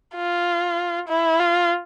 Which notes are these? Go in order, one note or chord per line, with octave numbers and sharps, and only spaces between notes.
F4
E4
F4